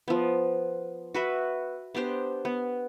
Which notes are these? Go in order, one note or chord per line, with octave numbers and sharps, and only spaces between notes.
F3 B3
F#4 B4 E5
B3 D4 G4 C5
B3